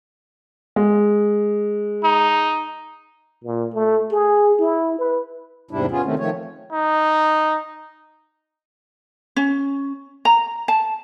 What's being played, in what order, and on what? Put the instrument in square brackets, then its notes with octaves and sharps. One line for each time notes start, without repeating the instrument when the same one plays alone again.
[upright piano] G#3
[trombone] D#4
A#2
A3
G#4
E4
B4
[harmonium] E2 G#2 C3 G3 D4 E4
B3 C#4 F4 G#4
C3 D#3 A3 C4 C#4
D#3 F3 A3 C#5
[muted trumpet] D#4
[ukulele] C#4
A#5
A5